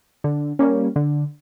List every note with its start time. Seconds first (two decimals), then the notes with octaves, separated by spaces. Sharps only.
0.24 D3
0.59 G3 A#3 C#4
0.96 D3